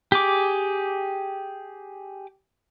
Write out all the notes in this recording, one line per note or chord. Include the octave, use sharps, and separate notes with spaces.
G4 G#4 D6